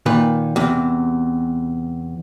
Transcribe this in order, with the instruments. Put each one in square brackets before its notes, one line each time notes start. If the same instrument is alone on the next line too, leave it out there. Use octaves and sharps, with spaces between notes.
[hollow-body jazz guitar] A#2 D#3 B4
E2 C3